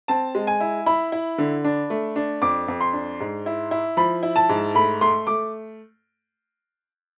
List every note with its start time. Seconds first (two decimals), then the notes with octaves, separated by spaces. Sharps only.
0.08 C4 A5
0.35 G#3
0.47 G#5
0.60 E4
0.86 E4 B5
1.12 E4
1.38 D3
1.64 D4
1.90 A3
2.16 D4
2.42 F2 D6
2.68 F2
2.81 C6
2.93 D4
3.20 G#2
3.46 E4
3.71 E4
3.97 F3 B5
4.23 E4
4.36 A5
4.49 G#2
4.75 A3 B5
5.01 A3 C6
5.27 A3 D6